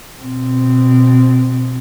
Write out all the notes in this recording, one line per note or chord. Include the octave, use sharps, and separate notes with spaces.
B2 C4